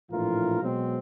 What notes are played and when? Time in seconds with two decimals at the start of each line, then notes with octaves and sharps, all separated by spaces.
0.11 A#1 A2 E3 F4 A#4
0.62 B2 F#3 G#3 C4